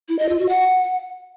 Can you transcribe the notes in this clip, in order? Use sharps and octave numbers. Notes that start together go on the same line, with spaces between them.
E4
D#5
F4
F#4
F#5